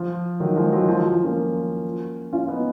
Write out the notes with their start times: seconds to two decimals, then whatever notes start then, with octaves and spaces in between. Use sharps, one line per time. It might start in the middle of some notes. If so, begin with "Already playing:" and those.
Already playing: F3
0.40 D#3 F#3
0.56 F3 G#3
0.72 D#3 F#3
0.83 D#3
0.88 F3
1.00 F3
1.13 F3
1.24 A#3 C#4
2.33 C#4 F4
2.48 B3 D#4